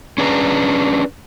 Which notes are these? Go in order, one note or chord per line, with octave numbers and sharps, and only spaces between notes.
C#4 D4 G#4 B4 F#5 A#5